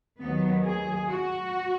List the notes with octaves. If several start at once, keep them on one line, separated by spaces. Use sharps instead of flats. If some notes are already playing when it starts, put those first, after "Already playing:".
D#2 D#3 F#3 B3
G#4
F#4